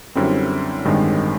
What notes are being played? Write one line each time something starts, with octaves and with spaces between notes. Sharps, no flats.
F#2 D3 G3 C4 E4
A1 G2 D#3 G#3 C4